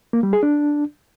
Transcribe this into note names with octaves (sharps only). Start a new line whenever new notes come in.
A#3
G3
G#4
D4